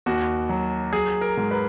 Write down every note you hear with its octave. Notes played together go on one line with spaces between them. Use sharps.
D#2 F#4
F#3
F#3 G#4
A#4
G#2
B4